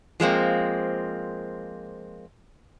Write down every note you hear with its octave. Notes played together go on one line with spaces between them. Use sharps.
F3 G#3 A#3 C4